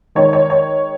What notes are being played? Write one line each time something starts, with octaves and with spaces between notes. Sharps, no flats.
D#3 G#3 D#4 C#5
C#5
C#5